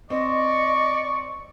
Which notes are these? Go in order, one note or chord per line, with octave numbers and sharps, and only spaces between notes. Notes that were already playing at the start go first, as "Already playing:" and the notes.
C4 D5 D#5 C#6